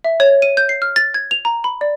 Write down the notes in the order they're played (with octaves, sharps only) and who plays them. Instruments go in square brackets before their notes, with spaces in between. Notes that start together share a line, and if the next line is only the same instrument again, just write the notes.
[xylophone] E5
C#5
D#7
G6
C7
F6
A6
G#6
F7
A#5
B5
D5